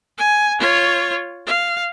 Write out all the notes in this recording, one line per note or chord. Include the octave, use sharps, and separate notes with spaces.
G#5
F4 C#5
F5